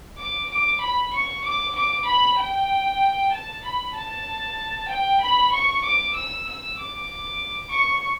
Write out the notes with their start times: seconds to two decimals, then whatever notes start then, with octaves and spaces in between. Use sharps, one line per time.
0.18 D6
0.51 D6
0.81 B5
1.13 C#6
1.45 D6
1.75 D6
2.06 B5
2.39 G5
3.33 A5
3.64 B5
3.95 A5
4.89 G5
5.20 B5
5.52 C#6
5.83 D6
6.15 E6
6.46 E6
6.78 D6
7.71 C#6